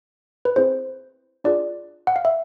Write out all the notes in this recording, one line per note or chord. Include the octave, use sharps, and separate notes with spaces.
B4
C4 E4 G#4 C5
D4 F4 G#4 D5
F#5
F5
E5